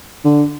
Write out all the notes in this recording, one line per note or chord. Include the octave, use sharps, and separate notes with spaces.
D3